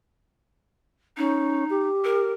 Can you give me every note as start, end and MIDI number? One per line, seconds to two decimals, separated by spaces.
1.17 1.64 61
1.17 1.88 63
1.70 2.32 67
2.04 2.33 70